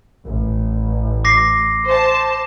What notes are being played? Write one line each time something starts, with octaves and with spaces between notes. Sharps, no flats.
A1
D6 A#6 C7
C5 A5